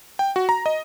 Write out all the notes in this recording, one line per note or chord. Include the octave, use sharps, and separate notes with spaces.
G5
F#4
A#5
D#5